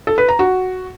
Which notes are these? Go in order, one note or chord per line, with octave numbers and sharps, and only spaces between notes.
A4
B4
A#5
F#4